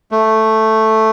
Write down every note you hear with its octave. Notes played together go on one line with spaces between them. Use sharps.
A3